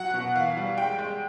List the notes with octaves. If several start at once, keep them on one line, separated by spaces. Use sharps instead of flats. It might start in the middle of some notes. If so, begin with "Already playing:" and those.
Already playing: F#3 F#5
B2
E3 F5
G3
G#3 G5
G#3